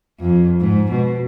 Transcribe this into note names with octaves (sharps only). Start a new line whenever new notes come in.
F2
G#2
B2